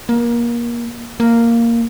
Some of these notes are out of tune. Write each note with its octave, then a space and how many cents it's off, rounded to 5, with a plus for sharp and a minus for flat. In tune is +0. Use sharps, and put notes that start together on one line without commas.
A#3 +25
A#3 -5